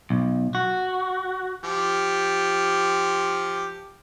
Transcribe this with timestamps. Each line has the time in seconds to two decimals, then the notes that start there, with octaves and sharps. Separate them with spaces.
0.10 B1
0.55 F#4
1.64 F3 G4